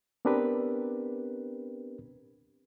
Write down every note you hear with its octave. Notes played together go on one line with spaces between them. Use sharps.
B3 C4 D4 G4 A#4 B4